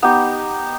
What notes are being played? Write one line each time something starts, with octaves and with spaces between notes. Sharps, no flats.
B3 D#4 G4